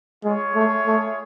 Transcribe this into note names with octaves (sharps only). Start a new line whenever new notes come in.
G#3 F4 G#4 C#5
A3
A3